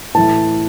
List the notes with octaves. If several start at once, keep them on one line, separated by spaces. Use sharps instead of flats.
A2 E3 A3 A5